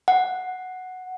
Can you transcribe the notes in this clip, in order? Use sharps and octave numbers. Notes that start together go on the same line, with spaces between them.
F#5